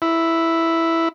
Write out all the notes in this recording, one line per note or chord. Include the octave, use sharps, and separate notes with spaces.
E4